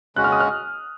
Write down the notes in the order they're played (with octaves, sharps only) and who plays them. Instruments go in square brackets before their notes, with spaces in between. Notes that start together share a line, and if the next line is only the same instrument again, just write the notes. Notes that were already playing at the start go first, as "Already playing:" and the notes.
[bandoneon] C#3 G#3 C#4 F#4 [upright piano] F#6
[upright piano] F6
D#6
F6